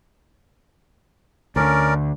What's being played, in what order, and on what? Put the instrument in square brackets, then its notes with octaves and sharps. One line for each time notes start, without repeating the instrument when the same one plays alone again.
[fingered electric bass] D2 D3 [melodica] C#4 A#4 D5